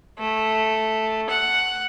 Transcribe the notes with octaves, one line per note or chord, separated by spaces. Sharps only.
A3
F#5